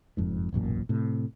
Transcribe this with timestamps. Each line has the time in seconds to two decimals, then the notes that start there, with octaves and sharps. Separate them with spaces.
0.17 F#1 F2 G#2
0.53 E1 A1 F#2 A#2
0.89 A2 C3